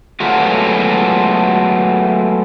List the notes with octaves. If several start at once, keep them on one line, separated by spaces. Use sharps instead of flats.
F#3 G#3 A3 B3 F4 F#4